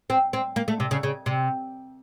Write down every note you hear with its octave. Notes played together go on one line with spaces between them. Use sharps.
C4
C4
A#3
A3
C3
C#3
C#3
C3